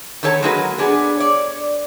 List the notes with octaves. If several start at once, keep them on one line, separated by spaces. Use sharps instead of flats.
D#3 B3 A4 C#5 A5
F#3 G#3 A#3 D#4 F#4 B4
B3 D4 G#4
C#5 D5